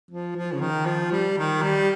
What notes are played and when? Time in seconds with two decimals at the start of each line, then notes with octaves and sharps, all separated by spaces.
0.11 F3
0.36 F3
0.52 C#3
0.61 D#3
0.86 F3
1.12 G3
1.38 D#3
1.62 G3